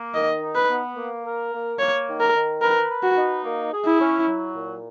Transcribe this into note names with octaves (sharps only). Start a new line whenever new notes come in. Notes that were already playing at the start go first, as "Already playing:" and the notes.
Already playing: A#3
D#3 D#5
D#4
B4
B3
A#3
A#4
A#3
A#3 C#5
D#3
A#4
D#3
A#4 B4
B4
F#4
D#4
A#3
G#4
E4
C#4
F#3
A#2